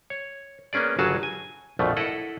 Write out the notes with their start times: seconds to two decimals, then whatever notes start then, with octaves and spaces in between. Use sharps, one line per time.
0.10 C#5
0.73 A#3 B3 C#4 G#4 D5
0.99 G1 C#3 F#3 F#4 G#4 A5
1.23 G#5
1.79 A#1 F2 B2 F3 A3
1.97 E4 A4 D#5 F#5